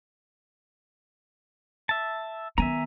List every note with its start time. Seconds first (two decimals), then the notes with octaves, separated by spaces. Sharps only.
1.89 E5 A5
2.58 D#3 B3 E5 G#5 A#5